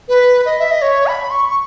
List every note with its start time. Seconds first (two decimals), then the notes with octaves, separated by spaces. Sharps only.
0.09 B4
0.46 D#5
0.59 E5
0.71 D#5
0.82 C#5
1.07 B5
1.30 C#6
1.49 C#6